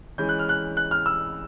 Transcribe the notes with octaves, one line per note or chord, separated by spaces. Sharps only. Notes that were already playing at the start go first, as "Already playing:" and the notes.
E3 G#3 C#4 G6
F#6
F6
F#6
F#6
F6
E6